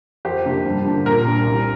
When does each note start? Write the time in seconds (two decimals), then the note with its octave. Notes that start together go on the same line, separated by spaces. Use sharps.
0.25 F2 G4 C5
0.46 C3 A#3 D4
0.65 G2
0.85 D3 A#3 D4
1.05 A#2 A#4
1.26 G3 D4
1.46 C2